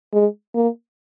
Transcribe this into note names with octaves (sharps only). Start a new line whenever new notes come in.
G#3
A#3